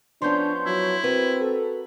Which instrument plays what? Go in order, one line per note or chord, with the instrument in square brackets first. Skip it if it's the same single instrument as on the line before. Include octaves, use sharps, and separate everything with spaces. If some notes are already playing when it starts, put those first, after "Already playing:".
[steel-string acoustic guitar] F3 B3 C#4 [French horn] D4 [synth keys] C6 C#6 G6
[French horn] F#3 [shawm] E4
[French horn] C4 [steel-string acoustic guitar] F#4 A#4 B4
[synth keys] A4